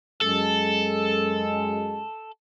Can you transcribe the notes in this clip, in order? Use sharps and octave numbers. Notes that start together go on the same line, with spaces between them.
F#2 G#3 A4